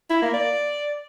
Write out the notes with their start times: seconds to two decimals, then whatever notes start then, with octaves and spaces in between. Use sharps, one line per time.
0.10 E4
0.22 A#3
0.34 D5